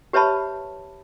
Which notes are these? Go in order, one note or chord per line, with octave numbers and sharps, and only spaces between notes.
G4 B4 C#5 E5 A5 B5